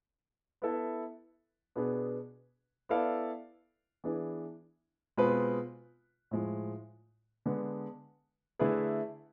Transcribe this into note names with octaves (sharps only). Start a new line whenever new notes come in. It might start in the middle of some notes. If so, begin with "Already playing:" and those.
B3 E4 A4 E5
B2 B3 D4 G#4 B4
B3 E4 A4 D5 F5
E3 B3 D4 G#4
B2 G#3 C4 F4 B4
A2 F3 G#3
D3 G#3 B3
D3 A3 E4 G#4 B4